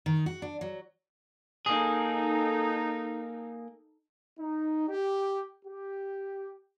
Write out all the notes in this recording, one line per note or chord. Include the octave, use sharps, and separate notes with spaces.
D#3
F#4
D4
F#3
A#3 D#4 G#4 A4
D#4
G4
G4